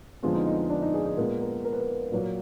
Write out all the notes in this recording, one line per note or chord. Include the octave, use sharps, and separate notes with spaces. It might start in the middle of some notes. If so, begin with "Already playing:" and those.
F2 D3 G#3 B3 F4
D#4
D#4
D#4
D4
D#4
G#4
G#4
A#2 G#3 B3 A#4
A#4
A#4
B4
A#4
A#2 F#3 A#3 A#4